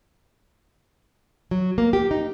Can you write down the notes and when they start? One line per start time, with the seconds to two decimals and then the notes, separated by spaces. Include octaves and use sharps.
1.51 F#3
1.78 A#3
1.93 G4
2.11 D#4